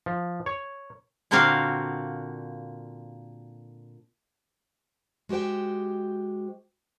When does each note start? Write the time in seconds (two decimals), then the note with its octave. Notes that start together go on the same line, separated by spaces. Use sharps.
0.06 F3
0.46 C#5
1.31 A#2 D3 A#3 C4 F#4 F5
5.29 G#3 F#4 G4 C5 G5